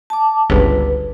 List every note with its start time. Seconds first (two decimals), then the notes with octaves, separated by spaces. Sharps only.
0.10 A5 D6
0.50 G1 C#2 B4